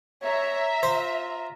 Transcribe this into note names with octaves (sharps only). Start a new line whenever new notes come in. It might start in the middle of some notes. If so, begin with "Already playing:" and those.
C#5 E5 A#5
F4 C5